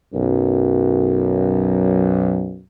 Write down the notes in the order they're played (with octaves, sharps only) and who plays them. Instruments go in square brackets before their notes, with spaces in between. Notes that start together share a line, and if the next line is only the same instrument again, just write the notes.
[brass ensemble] B1 F#2